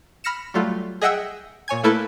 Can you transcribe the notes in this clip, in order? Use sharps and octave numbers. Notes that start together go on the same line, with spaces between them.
B5 F6 A#6 C#7 E7
F#3 G3 A3 F4
G#4 D#5 E5 F#5 G5 E6
A#2 C#5 G#5 G#6
A3 A#3 E4 A4 B4